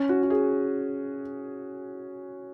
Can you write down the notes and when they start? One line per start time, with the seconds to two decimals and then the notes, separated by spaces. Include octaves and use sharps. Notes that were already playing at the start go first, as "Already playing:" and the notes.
Already playing: C#4
0.09 F#4
0.23 F#4
0.30 G#4